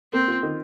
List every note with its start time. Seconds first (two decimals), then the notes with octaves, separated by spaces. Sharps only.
0.13 A#3 C4
0.28 F4
0.43 D#3